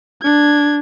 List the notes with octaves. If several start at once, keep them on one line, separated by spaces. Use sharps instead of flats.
D4 G#6